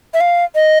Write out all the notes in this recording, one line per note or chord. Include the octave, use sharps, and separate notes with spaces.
E5
F5
D#5